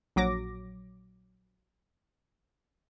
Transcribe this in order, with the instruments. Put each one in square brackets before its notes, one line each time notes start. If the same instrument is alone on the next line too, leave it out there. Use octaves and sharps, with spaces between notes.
[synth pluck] A#1 F#3 D6 A#6